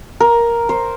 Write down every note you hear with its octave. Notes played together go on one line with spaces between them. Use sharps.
A#4
C5